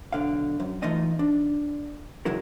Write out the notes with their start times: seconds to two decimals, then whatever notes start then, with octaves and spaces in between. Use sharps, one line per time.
0.13 B1 D3 F5
0.60 F#2
0.82 E3 A3 D#4 F4 D#5 E5
1.19 D4
2.25 C#3 F#3 G#3 E4 A#4